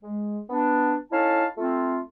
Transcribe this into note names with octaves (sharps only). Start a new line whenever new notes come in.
G#3
B3 D4
C#4 D#4 E4 A4 F5 A5
A3 C4 F4